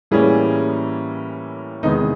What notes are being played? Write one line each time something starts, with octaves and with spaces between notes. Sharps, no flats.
A2 E3 G3 A#3 C#4 G#4
E2 C3 D#3 G#3 B3 D#4